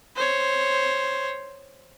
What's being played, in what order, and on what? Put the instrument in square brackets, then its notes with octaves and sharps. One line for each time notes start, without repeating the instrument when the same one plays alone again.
[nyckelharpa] C5 C#5